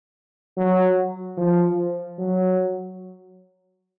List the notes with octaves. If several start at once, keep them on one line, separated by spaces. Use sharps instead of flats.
F#3
F3
F#3